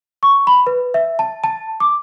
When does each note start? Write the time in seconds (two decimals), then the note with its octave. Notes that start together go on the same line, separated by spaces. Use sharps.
0.23 C#6
0.47 B5
0.67 B4
0.94 E5
1.19 A5
1.44 A5
1.80 D6